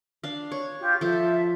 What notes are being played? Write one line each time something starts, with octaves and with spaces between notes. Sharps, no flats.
D4 F5
C#5
F4 G4
F3 A4 E5